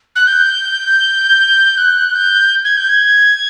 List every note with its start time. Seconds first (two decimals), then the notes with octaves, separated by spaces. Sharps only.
0.16 F#6
0.27 G6
1.78 F#6
2.15 G6
2.65 G#6
2.77 G6
2.89 G#6